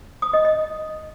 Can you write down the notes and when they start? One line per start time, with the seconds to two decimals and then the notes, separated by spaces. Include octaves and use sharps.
0.22 D#6
0.33 D#5
0.45 D#5